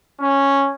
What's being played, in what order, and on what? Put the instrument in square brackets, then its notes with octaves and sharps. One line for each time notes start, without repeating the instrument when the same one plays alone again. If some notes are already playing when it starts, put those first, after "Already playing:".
[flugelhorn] C#4